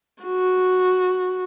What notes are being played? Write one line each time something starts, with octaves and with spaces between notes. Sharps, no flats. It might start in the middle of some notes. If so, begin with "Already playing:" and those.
F#4